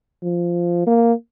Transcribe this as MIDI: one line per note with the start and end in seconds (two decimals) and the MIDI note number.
0.23 0.85 53
0.87 1.13 58